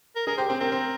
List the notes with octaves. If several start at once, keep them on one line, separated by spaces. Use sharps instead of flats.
A#4
G#4 A#4
G4 C5
C4 C5
C4 A#4
C4